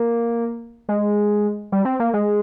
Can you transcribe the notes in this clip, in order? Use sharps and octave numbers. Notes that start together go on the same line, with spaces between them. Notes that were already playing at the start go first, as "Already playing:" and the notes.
Already playing: A#3
G#3
G3
C4
A#3
G#3